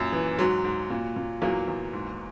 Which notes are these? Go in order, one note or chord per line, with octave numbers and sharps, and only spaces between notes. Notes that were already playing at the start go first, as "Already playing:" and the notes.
Already playing: F#2 A#2
E3
G#2 F#3
G#2
A#2
A#2
E2 F#3 A#3
E2
G#2